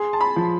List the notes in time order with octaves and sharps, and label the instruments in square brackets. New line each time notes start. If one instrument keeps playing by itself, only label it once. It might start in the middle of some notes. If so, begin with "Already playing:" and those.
Already playing: [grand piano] G#4 [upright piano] C6
[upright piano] A5
B5
[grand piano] F3